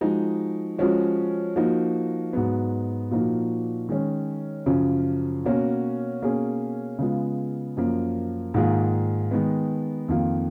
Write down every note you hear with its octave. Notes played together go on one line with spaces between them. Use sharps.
F3 G#3 D#4 F#4
F3 G#3 C#4 F#4
F3 A#3 D#4 F#4
G#2 F#3 B3
A#2 F3 A#3 D#4 F#4
D#3 G#3 C#4
F#2 C#3 F3
B2 A#3 C#4 F#4
B2 A#3 C#4 G#4
C#3 G#3 B3 F4
F#2 F3 A#3
G#2 D#3 A#3 F4 G#4
D#3 G#3 B3
F2 D#3 A#3 F4